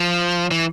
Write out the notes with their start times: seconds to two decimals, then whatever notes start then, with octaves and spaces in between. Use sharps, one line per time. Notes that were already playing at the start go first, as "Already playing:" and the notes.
Already playing: F3
0.51 E3